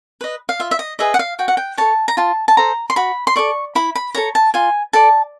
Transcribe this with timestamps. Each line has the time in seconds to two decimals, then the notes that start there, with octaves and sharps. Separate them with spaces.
0.21 B4 D#5
0.49 F5
0.59 F4 E5
0.71 E5
0.79 D#5
0.99 G#4 B4 D#5 E5
1.14 F#5
1.19 F5
1.39 F#4 G5
1.48 F#5
1.57 G5
1.77 A4 C#5 A5
2.08 A#5
2.17 F4 A5
2.48 A5
2.57 A4 C5 A#5
2.90 C6
2.96 F#4 B5
3.27 C6
3.36 A4 D5 C#6
3.75 E4 B5
3.95 B5
4.14 A4 C#5 A#5
4.35 A5
4.54 F4 G#5
4.93 A4 D5 A5